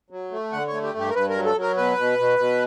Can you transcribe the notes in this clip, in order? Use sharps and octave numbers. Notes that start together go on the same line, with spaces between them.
F#3
A3
D3 F#5
A3 C#5
G4
G2 G4
A#4
G2 B4
A#4
F#3
A4
F#3 A#4
B2 B4
B2
B2
B2